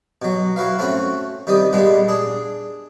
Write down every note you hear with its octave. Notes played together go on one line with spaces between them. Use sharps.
B2 F#3
E4 F#4 B4 F5
A3 C4 C#4 F#4
C3 D#3 G3 D5 D#6
A#2 G3 G#3 B3 D4
D4 G#4